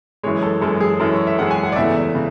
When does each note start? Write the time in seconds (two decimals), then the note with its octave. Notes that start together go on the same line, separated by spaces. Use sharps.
0.23 F#2 E3 G#3 C#5
0.42 A4
0.61 F#2 E3 G#3 A4
0.80 G#4
0.99 F#2 E3 G#3 A4
1.12 C#5
1.27 E5
1.38 F#2 E3 G#3 F#5
1.51 G#5
1.63 F#5
1.72 D5
1.76 E2 C#3 E3 A3 E5
2.15 C#3